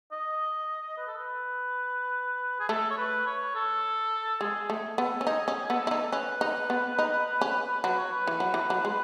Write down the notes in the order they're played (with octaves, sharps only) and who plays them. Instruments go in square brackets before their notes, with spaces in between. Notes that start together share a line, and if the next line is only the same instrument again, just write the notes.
[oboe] D#5
B4
A4
B4
G#4
[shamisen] A3 [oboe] A4
[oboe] C#5
B4
C#5
A4
[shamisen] G#3 [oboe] G#4
[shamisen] A3
[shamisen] B3 [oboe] A4
[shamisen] C#4
[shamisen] D#4 [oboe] G#4
[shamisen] C#4
[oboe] G#4
[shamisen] B3 [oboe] A4
[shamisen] E4
D#4
[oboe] A4
[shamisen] C#4 [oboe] B4
[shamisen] D#4
B3
D#4
C#4
[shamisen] F#3 [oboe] B4
[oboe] C#5
B4
[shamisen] E3
F#3
E3
F#3
G#3